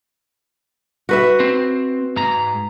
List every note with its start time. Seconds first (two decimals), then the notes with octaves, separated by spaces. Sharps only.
1.09 F#4 B4 E5
1.40 C4 C5
2.17 G#2 A#5